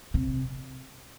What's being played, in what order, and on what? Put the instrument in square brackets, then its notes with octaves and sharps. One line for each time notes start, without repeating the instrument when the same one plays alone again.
[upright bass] C3